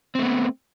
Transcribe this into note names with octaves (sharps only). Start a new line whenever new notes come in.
A3 B3 C4